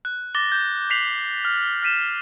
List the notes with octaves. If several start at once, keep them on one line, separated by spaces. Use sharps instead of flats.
F#6
D6 A6 A#6 G7
G6
G6 B6 C7 F7 F#7
F6
F6 A6 B6 D#7 E7